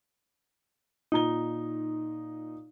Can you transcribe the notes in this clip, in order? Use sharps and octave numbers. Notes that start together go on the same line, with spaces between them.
A#2 D#4 A#5 G7